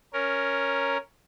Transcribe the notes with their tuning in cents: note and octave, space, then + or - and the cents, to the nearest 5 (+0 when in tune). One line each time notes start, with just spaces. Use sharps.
C#4 +0 A#4 +0